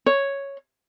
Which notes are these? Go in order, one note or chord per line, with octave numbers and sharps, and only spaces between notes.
C#5